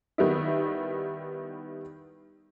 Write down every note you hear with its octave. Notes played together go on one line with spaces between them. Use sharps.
D#3 G3 B3 E4